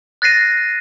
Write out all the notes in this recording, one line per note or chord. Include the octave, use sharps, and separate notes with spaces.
F#6 A6 A#6 C7 D#7